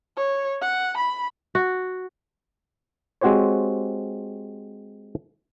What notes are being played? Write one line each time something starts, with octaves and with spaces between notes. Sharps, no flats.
C#5
F#5
B5
F#4
G#3 C4 F#4 G4 C5 C#5